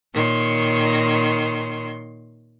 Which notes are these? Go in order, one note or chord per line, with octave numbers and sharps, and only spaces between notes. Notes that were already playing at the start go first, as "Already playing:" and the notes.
A#2 D#3 C#5 C6